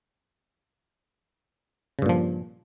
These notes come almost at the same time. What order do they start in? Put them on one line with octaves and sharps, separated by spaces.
C#3 G2 A#2 F3